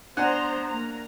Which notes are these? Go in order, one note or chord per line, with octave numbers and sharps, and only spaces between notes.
B3 D4 C5 F#5 G#5 A#5
A#3 A#5